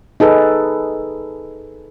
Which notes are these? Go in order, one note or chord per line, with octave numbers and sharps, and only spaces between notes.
D#4 G#4 A4 B4